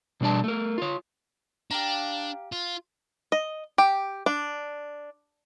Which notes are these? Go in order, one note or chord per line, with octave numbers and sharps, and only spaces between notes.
B2 G3 D4 D5 A5
A3 A#4
F4 C#5
D4 G4 F5 A#5
F4
D#5
G4
D4